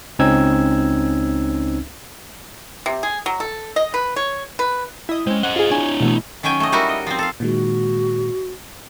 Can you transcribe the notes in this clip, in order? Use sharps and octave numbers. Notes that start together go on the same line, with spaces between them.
C#2 C4 C#4 D#4 E6 G#6
C3
G#4
F#3
A4
D#5
B4
C#5
B4
E4 D#5
G#3 C4 C#4
C5 D#5 F#5
F4 G#4
D4 E4 C#5 G#5
B2 E3 A3
D#3 F#3 C#4 G5 G#5
A3 D#5
G3 D#4 E4 F#4 A#4
D#5
F3 C4
A4 F5
A#2 D#3 G#3 F#4